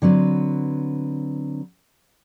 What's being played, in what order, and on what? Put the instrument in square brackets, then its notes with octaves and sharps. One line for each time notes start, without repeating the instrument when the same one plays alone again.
[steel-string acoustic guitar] D3 F#3 C4 B4